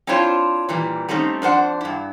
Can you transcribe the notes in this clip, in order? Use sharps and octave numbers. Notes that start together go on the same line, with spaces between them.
C4 D4 E4 F4 C5 C#5
A#2 E3 G3
G3 A3 C4 C#4 D#4
F2 D4 C5 F#5
G2 E4